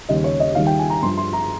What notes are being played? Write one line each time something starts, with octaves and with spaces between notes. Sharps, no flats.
D#2 C#3 G3 D#5
C#5
D#5
D#2 D#3 G3 F5
G5
G#5
A#5
G2 F3 C6
C6
A#5